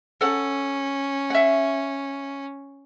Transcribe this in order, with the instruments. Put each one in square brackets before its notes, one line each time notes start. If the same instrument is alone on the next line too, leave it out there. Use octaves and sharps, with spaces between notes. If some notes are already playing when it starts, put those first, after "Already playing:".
[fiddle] C#4 [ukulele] A4 F#5
[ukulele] E5 F#5